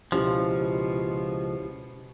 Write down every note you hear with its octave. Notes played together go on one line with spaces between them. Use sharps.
C#2 F#2 B2 F3 C#4 E4 G4